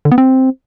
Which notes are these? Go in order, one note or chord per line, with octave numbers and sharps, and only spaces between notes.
D3
B3
C4